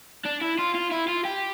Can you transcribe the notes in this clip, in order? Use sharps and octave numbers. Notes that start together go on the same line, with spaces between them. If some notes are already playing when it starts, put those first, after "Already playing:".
D4
E4
F4
F4
E4
F4
G4